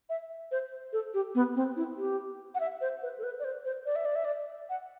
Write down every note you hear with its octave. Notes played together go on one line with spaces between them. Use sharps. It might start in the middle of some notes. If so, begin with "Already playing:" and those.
E5
C5
A4
G4
B3
C4
E4
G4
F#5
E5
C5
B4
A4
B4
D5
C5
C5
D5
E5
D5
E5
D5
F#5